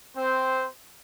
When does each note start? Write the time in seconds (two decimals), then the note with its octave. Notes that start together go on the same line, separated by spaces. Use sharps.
0.17 C4 C5